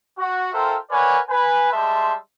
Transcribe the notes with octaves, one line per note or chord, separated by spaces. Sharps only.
F#4
F4 A4 A#4 C5 E5 G5
A#4 B4 C#5 D5 F#5 G#5
B4 G#5
G3 G#3 E5 A5 C6